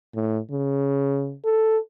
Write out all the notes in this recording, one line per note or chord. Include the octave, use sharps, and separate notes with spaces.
A2
C#3
A4